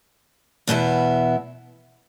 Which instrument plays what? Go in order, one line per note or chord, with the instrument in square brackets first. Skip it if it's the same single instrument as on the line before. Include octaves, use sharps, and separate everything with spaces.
[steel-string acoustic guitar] E2 B2 B3 E4